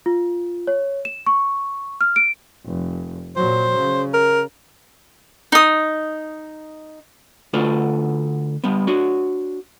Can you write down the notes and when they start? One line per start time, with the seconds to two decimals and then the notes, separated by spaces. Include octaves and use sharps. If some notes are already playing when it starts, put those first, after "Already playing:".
0.06 F4
0.67 C#5
1.05 E7
1.27 C#6
2.01 F6
2.16 D7
2.66 F1
3.36 A#2 F#3 C5
3.78 C#3
4.14 A#4
5.52 D#4 D#6
7.53 D3 A3 D4 F4 A4 B4
8.64 G3 B3
8.87 D4 F#4 C#5